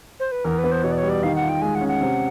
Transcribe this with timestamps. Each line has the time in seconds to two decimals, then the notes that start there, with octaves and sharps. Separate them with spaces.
0.20 C5
0.32 B4
0.44 E2 A#4
0.58 B4
0.64 B3
0.71 C5
0.83 B2 C#5
0.92 D5
0.97 C#5
1.03 G3
1.09 D5
1.23 D#3 F5
1.36 F#5
1.42 F4
1.49 G5
1.62 G#3 G#5
1.75 F#5
1.81 C#4
1.88 F#5
2.01 C3